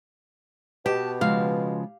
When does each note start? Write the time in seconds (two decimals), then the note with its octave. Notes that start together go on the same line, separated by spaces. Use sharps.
0.86 B2 G4 A5
1.21 C#3 F3 G#3 F5